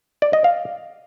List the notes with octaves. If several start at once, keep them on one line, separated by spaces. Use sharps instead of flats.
D5
D#5
F5